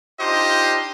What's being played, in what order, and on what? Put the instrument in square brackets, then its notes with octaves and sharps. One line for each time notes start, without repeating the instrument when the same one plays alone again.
[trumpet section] D4 D#4 F4 G4 C5 D#5